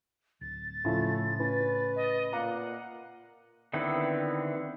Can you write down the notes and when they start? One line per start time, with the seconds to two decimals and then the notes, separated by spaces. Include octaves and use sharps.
0.41 D1 A6
0.85 A2 C#3 F3 A3 C#4 E4
1.40 C#4 B4
1.96 D#5
2.32 A#2 F5 F#5 A#5 D6
3.73 D3 D#3 B3 C4 E4